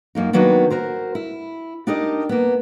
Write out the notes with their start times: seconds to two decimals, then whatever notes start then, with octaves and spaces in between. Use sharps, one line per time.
0.15 F#2 A#3 D#4
0.33 D#3 F#3 A#3 B3 D4
0.70 F#4 A#4 C5
1.15 E4
1.87 D4 D#4 G4 A#4 D#5
2.29 A#3 B3